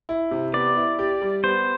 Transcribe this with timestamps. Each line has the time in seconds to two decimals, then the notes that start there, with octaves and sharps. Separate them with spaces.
0.09 E4
0.31 C3
0.53 B3 D5
0.77 E4
0.99 G4
1.22 G3
1.44 B3 C5